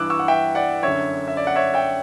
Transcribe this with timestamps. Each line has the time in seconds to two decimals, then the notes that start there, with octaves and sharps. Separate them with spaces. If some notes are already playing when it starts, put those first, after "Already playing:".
Already playing: G2 E3 D6 E6 F#6
0.10 C#6 E6
0.19 F#5
0.28 E5 G5
0.55 D5 F#5
0.83 F#2 D3 C#5 E5
1.28 E5
1.37 D5
1.47 F#5
1.56 C#5 E5
1.74 E5 G5